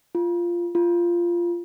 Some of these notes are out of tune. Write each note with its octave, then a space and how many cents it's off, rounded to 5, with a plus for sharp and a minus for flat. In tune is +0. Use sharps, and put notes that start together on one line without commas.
F4 -10
F4 -15